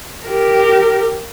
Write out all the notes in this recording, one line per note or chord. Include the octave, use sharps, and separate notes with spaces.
G4 A#4